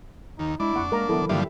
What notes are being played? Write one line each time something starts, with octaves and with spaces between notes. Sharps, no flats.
D#2 D#4
G#3 D4 E4
F2 A#3 F#5 C#6
G#3 A#3 A#4 A#5
D#3 E3 F#3 B3 E4 A4 A#4
G2 D3 F3 A#3 G4 E5